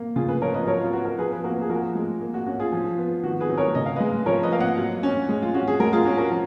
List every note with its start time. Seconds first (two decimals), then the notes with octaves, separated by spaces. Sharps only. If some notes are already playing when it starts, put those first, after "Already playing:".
Already playing: A#3
0.16 C#3 F4 G#4
0.29 G#4 B4
0.42 F3 A#4 C#5
0.54 B4 D#5
0.67 F#3 A#4 C#5
0.80 F4
0.93 B3 F#4
1.05 F#4 A#4
1.18 F3 G#4 B4
1.32 B4
1.44 A#3 F#4 A#4
1.61 G#4
1.69 F3 F#4 A#4
1.95 G#3
2.21 A#3
2.34 F#4
2.47 C#4 F#4
2.59 F4 G#4
2.72 F3
2.98 B3
3.23 D#3 F#4
3.41 G#4 B4
3.49 F#3
3.57 A#4 C#5
3.75 C#3 D#5
3.86 F5
3.96 G#3 B4 D#5
4.26 F3 A#4 C#5
4.43 B4 D#5
4.52 A#3 F5
4.60 D#5 F#5
4.78 F#3
5.03 C#4
5.29 G#3
5.42 F4
5.54 C#4 F#4
5.68 G#4
5.80 G#3 F#4 A#4
5.93 F4 G#4
6.05 C#4 F#4
6.18 F#4 A#4
6.31 F3